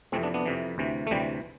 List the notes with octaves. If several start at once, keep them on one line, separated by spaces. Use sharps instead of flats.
F2 C3 E3 A3 C4
B3 D4
B3 D4
F2 C3 E3
D2 C3 E3
A3
D2 C3 E3 G3